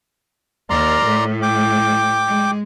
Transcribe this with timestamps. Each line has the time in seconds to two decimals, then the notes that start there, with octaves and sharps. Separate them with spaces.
0.70 D#2 A#4 D5 A#5 C6
1.05 A2
1.42 G5 D6
2.26 G#3